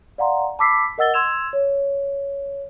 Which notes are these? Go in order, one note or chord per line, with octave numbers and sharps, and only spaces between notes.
D5 F5 F#5 A#5 C6
A5 B5 D6 E6 B6 C7
A#4 D#5 F#5 E6 A6 G7
C6 E6 G#6 E7 F7
C#5